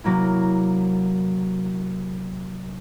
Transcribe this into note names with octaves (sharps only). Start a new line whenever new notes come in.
C3 F#3 A#3 E4